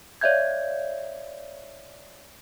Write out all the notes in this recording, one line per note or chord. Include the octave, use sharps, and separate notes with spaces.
C#5 D5 E5 F5 G6 G#6